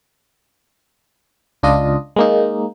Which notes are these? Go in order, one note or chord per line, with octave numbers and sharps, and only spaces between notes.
C#2 D4 F4 D#5
G#3 A#3 D#4